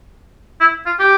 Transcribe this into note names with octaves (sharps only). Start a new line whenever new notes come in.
E4
F4
G4